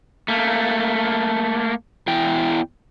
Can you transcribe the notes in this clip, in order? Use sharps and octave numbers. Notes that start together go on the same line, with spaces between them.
A3 A#3
E2 E3 G5